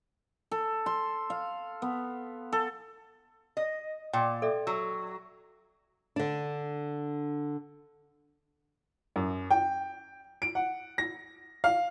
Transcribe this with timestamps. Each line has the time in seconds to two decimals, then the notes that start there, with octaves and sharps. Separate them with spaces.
0.51 A4
0.86 C6
1.30 F5
1.82 B3
2.52 A4
3.57 D#5
4.13 A#2 G5
4.42 A4 D5 E5
4.67 F#3 E6
6.16 D3 D4
9.16 F#2
9.51 G5
10.42 D7
10.55 F#5
10.98 A#6
11.64 F5